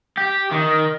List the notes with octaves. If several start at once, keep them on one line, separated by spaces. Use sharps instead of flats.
G4
D#3